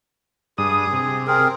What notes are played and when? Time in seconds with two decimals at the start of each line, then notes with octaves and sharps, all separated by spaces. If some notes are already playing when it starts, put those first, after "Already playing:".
0.58 G2 G#4 D#6
0.93 C3
1.27 C4 G#4 A#4